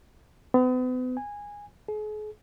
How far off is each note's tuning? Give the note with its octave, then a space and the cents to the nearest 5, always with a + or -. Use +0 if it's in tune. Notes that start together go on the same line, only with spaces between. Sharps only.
B3 +40
G#5 -15
G#4 +40